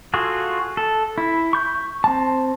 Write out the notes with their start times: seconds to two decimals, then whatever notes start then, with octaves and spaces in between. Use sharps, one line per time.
0.14 F4 F#4 G#4 A4
0.77 A4
1.18 E4
1.53 C#6 G6
2.04 C4 A5